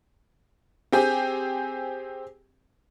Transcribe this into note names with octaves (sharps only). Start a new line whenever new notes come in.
C4 G4 G#4